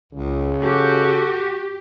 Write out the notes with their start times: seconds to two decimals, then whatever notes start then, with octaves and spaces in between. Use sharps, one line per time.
0.13 C#2 C#3
0.62 F#4 G4 A4